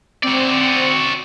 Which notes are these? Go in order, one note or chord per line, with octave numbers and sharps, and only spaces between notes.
C4 F#4 D5